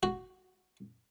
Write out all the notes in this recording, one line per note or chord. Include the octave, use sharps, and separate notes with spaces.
F#4